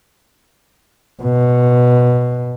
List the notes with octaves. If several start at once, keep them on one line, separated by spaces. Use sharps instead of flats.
B2